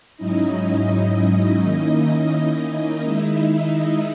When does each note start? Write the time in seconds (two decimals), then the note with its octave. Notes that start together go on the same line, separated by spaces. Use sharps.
0.17 G#2 F#3 C#4 D#4 E4 D#5
1.60 D#3 A#3 C#4 D#4 E4 D#5
3.03 D#3 G#3 D#4 E4 E5
3.75 D#4 D#5